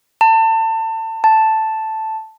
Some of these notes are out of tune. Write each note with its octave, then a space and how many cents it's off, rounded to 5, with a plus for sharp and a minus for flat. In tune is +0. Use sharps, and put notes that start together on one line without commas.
A5 +30
A5 +0